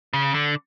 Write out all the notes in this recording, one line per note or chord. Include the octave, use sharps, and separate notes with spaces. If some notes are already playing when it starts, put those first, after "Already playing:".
C#3
D3